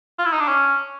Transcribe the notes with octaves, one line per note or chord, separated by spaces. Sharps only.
F4
E4
D#4
D4
C#4